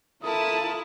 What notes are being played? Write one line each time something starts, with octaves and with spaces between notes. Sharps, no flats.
E4 F4 A4 A#4 A5 D#6